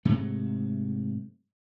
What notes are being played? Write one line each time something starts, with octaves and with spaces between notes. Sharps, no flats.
G#2 C3 F#3 A3